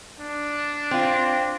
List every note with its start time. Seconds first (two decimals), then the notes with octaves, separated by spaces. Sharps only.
0.20 D4
0.91 C4 F4